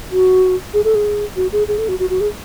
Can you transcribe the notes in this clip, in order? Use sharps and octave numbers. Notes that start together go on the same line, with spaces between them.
F#4
G#4
A4
G#4
F#4
G#4
G#4
A4
F#4
F#4
F#4
G#4